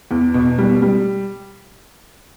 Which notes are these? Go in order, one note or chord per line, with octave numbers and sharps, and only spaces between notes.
E2
B2
G3
G3